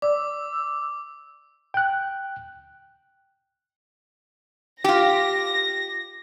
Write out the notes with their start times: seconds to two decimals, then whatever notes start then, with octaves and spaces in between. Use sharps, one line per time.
0.02 D5 D6 E6
1.74 G5 F#6
4.84 F4 G4 A#6